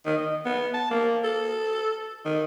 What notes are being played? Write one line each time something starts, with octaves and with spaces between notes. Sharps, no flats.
D#3
D#5
B3
A5
A#3
A4
D#3